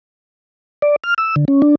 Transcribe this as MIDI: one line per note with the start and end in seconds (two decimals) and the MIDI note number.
0.82 0.96 74
1.04 1.14 89
1.18 1.35 88
1.36 1.45 50
1.48 1.62 61
1.62 1.75 62